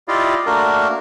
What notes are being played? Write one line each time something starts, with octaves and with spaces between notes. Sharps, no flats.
E4 F4 G4 D5 D#5 F5
A3 A#3 D4 F#4 A#4